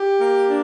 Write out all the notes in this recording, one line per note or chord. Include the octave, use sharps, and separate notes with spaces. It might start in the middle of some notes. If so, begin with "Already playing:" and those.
Already playing: G4
A#3
D4